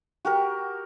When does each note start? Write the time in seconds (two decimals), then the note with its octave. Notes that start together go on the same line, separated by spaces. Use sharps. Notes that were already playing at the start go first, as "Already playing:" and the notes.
0.25 F#4 G4 A#4